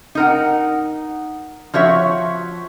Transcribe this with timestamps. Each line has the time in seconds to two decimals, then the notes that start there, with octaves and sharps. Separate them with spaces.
0.15 D#4 A#4 F#5
1.74 F3 F#4 C#5 E5